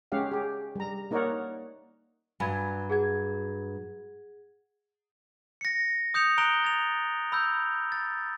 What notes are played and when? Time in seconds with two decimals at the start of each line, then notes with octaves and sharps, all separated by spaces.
0.12 G#3 C#4 G4 F5 F#5
0.32 G4 G#4
0.76 G3 A#5
1.11 A#3 D#4 A#4 C#5 D5 F#5
2.40 G2 F#3 G#5 B5 G#6
2.90 G#4 F#5 G#6
5.61 A#6 C#7
6.14 D#6 G6 C#7 F7
6.38 A#5 F#6 D7 F7 G7
6.64 A6 F7
7.32 B5 E6 G6
7.92 A6